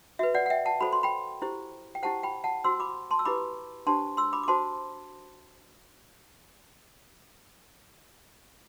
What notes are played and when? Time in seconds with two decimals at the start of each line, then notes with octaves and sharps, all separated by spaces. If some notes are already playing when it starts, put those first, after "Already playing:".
0.19 F#4 B4 E5
0.34 D5 F#5
0.46 F#5
0.50 E5 G5
0.65 F#5 A5
0.81 F#4 A4 C5 B5
0.93 C6
1.03 G5 B5
1.42 E4 G4 C5
1.95 G5
2.03 E4 G4 C5 F#5 A5
2.23 G5 B5
2.44 F#5 A5
2.64 F#4 C5 C6 E6
2.80 B5 D6
3.11 A5 C6
3.19 E6
3.25 E4 G4 B4 B5 D6
3.87 D4 G4 C5 A5 C6
4.17 C6 E6
4.33 B5 D6
4.43 D6
4.48 F#4 C5 A5 C6